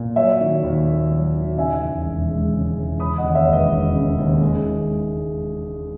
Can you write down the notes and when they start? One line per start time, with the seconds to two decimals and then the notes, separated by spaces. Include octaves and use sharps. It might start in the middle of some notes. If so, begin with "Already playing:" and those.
Already playing: A#2
0.16 F#3 C#5 E5
0.41 D#3
0.63 D#2
0.87 A#3
1.11 F#3
1.35 D#3
1.58 C#3 E5 G#5
1.82 E2
2.05 E1
2.29 G#3
2.53 C#3
2.77 E2
2.99 C#3 B5 D#6
3.18 D#5 F#5
3.24 D#2
3.35 C#5 E5
3.47 E1
3.53 B4 D#5
3.71 E1
3.95 C#3
4.18 D#2
4.41 G#3
4.66 D#3